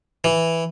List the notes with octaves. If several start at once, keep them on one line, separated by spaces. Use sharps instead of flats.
E3